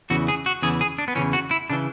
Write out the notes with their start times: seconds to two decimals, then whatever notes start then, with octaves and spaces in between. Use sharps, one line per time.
0.10 E2 C#3 E3 F#4
0.28 G#4
0.46 F#4
0.62 E2 C#3 E3 G#4
0.81 G#4
0.98 D4
1.08 B3
1.15 E2 C#3 E3 C#4
1.33 F#4
1.51 E4
1.70 C#3 E3 D4